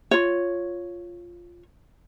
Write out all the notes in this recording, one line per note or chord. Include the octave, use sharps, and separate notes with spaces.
F4 C#5